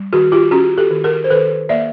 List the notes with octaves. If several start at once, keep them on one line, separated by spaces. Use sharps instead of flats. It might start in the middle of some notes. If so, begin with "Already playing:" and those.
Already playing: G3
D#3 F#4 G#4
F4 G4
C#4 F#4 G#4
G4 A4
D#3
G#4 A#4
C5
D#3 A4 B4
A#3 D5 E5